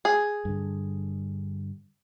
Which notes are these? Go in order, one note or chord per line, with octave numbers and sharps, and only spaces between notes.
G#4
G2 D3